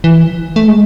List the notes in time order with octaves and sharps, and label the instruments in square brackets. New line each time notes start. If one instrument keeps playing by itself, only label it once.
[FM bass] E3
A3
G#3